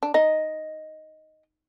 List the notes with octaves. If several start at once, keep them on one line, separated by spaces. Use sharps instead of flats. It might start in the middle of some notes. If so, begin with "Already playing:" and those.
D4
D#4 D#5